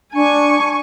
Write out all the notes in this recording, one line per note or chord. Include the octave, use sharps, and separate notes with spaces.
D4 G#5 C#6